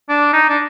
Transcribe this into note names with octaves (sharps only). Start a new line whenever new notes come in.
D4
D#4
D4